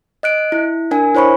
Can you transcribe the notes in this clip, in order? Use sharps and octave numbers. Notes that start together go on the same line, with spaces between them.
D#5 F#6 D7
E4
D4 A#4 G#5
E4 C5 C#5 B5 C#6